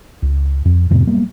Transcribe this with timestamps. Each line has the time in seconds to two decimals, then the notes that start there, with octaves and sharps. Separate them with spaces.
0.22 C#2
0.65 F2
0.90 F2 A2 C3 B3
1.07 F#3 G3 A#3 B3